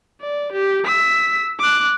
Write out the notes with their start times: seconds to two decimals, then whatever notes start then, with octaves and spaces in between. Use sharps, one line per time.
0.21 D5
0.52 G4
0.85 E6 B6
1.59 D6 F#6